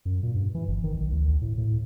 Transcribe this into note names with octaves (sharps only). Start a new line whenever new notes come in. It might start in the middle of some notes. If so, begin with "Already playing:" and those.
F#2
A#2
G2
E3
G1
D#3
B1
D2
A2
A2